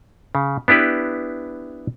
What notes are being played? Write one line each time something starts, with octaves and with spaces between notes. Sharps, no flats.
C#3
B3 D4 E4 G4 B4